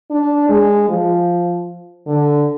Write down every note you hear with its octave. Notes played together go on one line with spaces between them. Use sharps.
D4
G#3
F3
D3